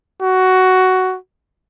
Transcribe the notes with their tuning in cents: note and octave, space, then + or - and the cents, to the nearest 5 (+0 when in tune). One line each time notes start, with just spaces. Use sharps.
F#4 +10